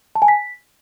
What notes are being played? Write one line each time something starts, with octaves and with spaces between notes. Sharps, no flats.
A5
G#5
B6